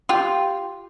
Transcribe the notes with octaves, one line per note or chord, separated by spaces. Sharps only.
F4 G4 C6